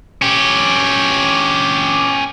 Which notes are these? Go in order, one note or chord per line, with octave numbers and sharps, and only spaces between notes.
C#4 G4